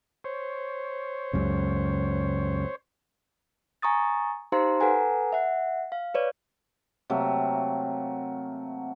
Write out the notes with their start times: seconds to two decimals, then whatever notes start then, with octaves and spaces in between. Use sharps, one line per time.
0.24 C5 C#5
1.33 C#2 F#2 C#3
3.82 G#5 A#5 C#6 D#6 A6
4.52 D#4 G4 C5 F5 A#5 C6
4.80 A4 B4 F#5 G#5 A#5
5.33 E5 F#5
5.92 F5
6.14 B4 C#5 D5
7.10 C3 F#3 A3 A#3